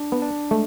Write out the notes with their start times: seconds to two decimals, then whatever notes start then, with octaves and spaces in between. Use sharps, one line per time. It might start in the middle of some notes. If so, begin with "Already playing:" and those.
Already playing: D4
0.12 B3
0.22 D4
0.51 G#3 A3